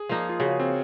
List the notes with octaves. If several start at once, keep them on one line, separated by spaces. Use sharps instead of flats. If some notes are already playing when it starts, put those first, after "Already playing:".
Already playing: G#4
F3 A#3 D#4
F4
C#3 F#4
C4